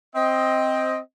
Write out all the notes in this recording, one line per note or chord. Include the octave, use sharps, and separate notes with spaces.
C4 D#5